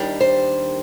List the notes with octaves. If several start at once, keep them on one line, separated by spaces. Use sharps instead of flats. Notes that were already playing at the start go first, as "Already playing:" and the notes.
Already playing: D#2 D#3 G3 D4
C5